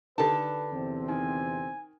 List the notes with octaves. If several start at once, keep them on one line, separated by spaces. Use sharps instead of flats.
D3 D#3 G4 A4 B4 A5
E2 C3 C4
D#3 G#5